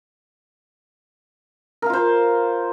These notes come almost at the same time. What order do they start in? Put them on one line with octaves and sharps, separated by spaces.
A#4 F5 F4 C5